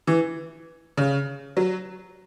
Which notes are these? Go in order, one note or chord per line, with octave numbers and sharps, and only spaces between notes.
E3
C#3
F#3